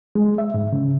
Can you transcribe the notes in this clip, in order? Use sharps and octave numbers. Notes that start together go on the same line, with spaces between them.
G#3
E5
G#2
C#3